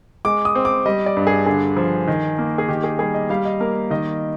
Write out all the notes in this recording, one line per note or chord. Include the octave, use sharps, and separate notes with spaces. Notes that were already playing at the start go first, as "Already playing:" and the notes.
G#3 D6
D#6
C4
D6
G3 D#5
D5
G2
G#4
D3 G#4
F3
D#3
A#3
G#4
D#3 G4
G#4
G3 G#4
D#5
G3 F5
D#5
A#3 A#4
D#3 D#5